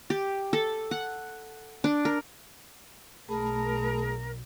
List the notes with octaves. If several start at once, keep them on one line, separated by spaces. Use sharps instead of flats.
G4
A4
F#5
D4
A#4
B1 A3 G#4 A#4 A5 B5